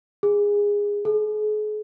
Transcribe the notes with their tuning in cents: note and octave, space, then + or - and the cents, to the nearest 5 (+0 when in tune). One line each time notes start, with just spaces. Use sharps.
G#4 -20
G#4 +40